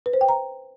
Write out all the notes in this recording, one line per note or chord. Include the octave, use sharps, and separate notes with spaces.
B4
C5
G5
A#5